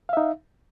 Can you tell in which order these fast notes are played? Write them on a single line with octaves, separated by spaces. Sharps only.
F5 E5 D#4